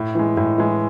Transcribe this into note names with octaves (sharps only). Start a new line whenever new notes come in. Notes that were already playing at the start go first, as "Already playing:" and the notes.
Already playing: A2
E3 G#3
A2
E3 G#3